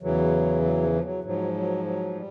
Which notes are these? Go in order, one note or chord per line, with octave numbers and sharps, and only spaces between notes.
E2 C#3 E3 F#3
F#3
F3
F3
F#3
G#2 F3 F#3
F#3
F#3
G3